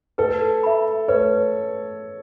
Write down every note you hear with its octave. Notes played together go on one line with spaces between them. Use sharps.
A4 B4
E5 B5
B4 C#5